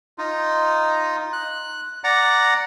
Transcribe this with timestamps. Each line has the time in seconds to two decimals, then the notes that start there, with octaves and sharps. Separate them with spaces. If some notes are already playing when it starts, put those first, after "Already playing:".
0.18 D#4 F4
1.33 F#6
2.04 D5 F#5 A#5